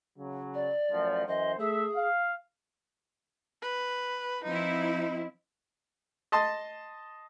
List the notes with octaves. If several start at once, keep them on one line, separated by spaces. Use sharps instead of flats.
C#3 F#3
D5
F#2 A2 F3
F#2 E3 C5 D#5
A3 G#4 E5
F5
B4
F3 C4 D#4 E4
D#5 A5 C6 D#6